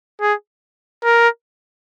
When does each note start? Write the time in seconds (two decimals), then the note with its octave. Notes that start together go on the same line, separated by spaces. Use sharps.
0.21 G#4
1.04 A#4